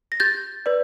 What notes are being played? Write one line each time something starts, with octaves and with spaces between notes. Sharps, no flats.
A#6
G4 G6 A6
B4 D5